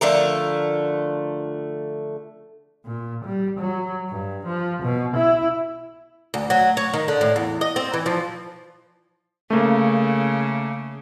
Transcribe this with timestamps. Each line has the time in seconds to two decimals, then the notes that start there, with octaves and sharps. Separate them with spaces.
0.01 D3 F3 A3 A#4
2.85 A#2
3.25 G3
3.59 F#3
4.09 G2
4.46 F3
4.83 B2
5.16 E4
6.34 D2
6.50 F#3
6.77 C#5
6.94 D#3
7.08 D3
7.21 A2
7.36 E2
7.61 D#5
7.76 C4
7.94 E3
8.06 F3
9.50 C#3 A3 A#3